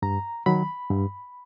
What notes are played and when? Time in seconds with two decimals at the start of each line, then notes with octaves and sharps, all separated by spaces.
0.02 G2 A#5
0.46 D#3 F#3 B5
0.90 G2